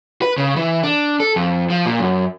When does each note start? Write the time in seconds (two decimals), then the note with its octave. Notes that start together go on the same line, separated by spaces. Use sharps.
0.22 B4
0.38 C#3
0.56 E3
0.83 D4
1.20 A4
1.36 F2
1.70 F3
1.86 A#2
2.00 F#2